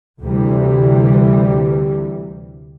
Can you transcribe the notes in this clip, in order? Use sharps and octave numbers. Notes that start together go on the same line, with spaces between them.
D2 C3 E3 G3